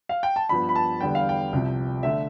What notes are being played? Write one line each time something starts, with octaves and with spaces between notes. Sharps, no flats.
F5
G5
A5
G2 F3 B3 B5
B5
A5
E2 D3 G3 B3 G5
F5
G5
C2 C3 F3
D3 A3 E5